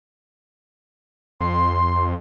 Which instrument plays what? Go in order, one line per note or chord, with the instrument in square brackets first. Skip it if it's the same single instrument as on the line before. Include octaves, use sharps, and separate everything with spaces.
[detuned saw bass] F2 [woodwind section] C6